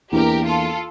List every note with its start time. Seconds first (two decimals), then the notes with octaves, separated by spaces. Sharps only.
0.12 E2 E3 A#3 D4 G4 A#4
0.44 F4 A4